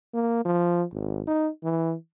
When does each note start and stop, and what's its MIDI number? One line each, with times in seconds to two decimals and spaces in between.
0.14 0.44 58
0.45 0.84 53
0.93 1.21 32
1.27 1.49 63
1.63 1.94 52